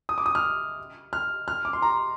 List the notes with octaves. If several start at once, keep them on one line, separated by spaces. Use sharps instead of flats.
D#6
D6
D#6
F6
F6
F6
D6
C6
A#5